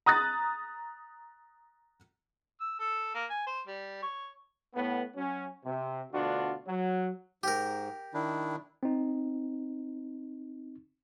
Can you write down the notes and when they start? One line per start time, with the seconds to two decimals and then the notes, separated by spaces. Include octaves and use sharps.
0.06 A#5 D#6 F#6 A6
2.60 E6
2.80 A4
3.15 A#3
3.30 G#5
3.46 C5
3.67 G3
4.02 C#5
4.75 A2 B3
5.16 F#3 C#4
5.65 C3
6.12 D2 B2 D4 F4 F#4
6.67 F#3
7.43 G#2 G4 A#4
8.14 D#3 D4 E4
8.83 C4 D#4